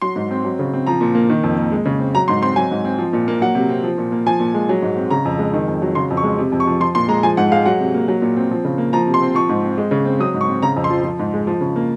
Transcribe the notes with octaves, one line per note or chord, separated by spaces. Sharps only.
F#3 C6
G#2
C4
F#3
C#3
C4
F3 A#5
A#2
A#3
D#3
F2
A#3
G#3
C#3
C4
F#3 A#5
G#2 C6
C4 C6
F#3 G#5
G#2
C4
F3
A#2
A#3
F#3 F#5
C3
C4
F3
A#2
A#3
F3 G#5
A#2
G#3
F#3
G#2
C4
C#3 A#5
F2
G#3
D#3
F2
F#3
C#3 C6
F2
C#6
G#3
C3
F2
C#6
F3
F3 C6
A#2 C6
G#3 A#5
F3 G#5
G#2 F#5
G#3 F5
F#3 F#5
C3
A#3
F#3
A#2
C4
F3
C#3
A#3
F3 A#5
C3
C6
C4
F3 C#6
G#2
C4
G#3
C#3
C4
F#3 D#6
G#2
C#6
C4
C#3 A#5
F2
C6
F3
F3
G#2
G#3
F3
C#3
A#3